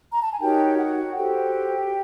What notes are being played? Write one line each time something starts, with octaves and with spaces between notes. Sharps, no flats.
A#5
A5
G#5
D#4 F#4 G4 A#4 C#5 G5
F#4 F#5
F#4 G4 A4 C5 G5